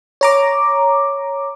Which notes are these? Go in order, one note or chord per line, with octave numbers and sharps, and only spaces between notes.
C#5 A#5 D6